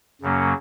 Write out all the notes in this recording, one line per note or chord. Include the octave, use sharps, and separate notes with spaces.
F#2 C#3 F#3 A#3 C#4